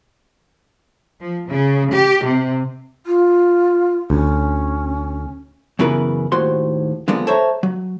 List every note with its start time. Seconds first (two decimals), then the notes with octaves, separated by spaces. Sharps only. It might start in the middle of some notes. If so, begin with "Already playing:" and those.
1.19 F3
1.49 C#3
1.93 G4
2.25 C3
3.06 F4
4.10 D2 C#4
5.79 F#2 C#3 E3 B3 A#4 B4
6.32 D#2 A2 F#4 C5 C6
7.08 D3 F3 G#3 A#3 B3 D4
7.27 A4 C5 C#5 E5 A#5
7.63 F#3